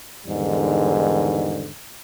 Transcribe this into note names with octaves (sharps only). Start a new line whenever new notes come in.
E2 G#2 D3 D#3 G3